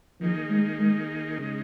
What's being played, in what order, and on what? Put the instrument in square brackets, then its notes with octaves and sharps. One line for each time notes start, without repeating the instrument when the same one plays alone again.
[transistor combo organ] D#3 A#3 D#4 G#4 [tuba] F3
[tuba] G#3
G#3
[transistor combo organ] C#3 G#3 D#4